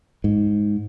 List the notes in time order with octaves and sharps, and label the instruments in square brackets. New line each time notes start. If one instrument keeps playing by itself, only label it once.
[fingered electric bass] G#2